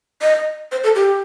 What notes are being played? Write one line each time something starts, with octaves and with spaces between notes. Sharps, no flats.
D#5
C5
A4
G4